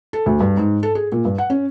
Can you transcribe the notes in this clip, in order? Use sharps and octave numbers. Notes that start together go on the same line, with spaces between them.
A4
D2
G2
G#2
A4
G#4
A#2
G2
F#5
C#4